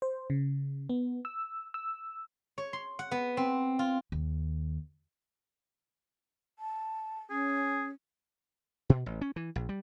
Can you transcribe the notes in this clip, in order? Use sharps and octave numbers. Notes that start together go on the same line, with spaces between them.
C5
C#3
B3
E6
E6
C#5
C6
F#5
B3
C4
F4
D#2
A5
C#4 G#4
B2
A1
C#4
E3
A#1
G3